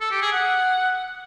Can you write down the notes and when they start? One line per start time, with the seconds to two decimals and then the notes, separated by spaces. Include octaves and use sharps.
0.01 A4
0.11 G4
0.21 G#4
0.32 F#5